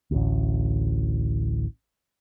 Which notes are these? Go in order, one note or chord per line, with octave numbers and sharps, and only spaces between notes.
A1 D2